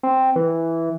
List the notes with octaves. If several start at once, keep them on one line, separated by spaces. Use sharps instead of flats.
C4
E3